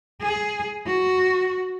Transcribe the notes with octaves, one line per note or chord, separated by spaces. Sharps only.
G#4
F#4